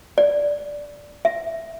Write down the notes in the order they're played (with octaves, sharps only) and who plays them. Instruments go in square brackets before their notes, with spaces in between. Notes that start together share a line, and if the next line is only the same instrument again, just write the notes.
[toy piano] D5
E5